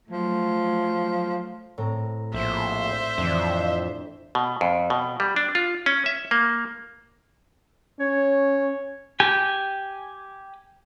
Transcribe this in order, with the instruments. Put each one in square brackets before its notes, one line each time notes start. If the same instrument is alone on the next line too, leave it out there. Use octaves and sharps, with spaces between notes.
[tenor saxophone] F3 [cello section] F#3 A3
[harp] A2 C4 A#5
[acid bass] A#1 [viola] C5 E5
[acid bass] F2 [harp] E3 D4
[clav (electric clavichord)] B2
F2
B2
G3
D4
F4
C#4
E5
A#3
[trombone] C#4 [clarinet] C#5
[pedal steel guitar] G4 G#5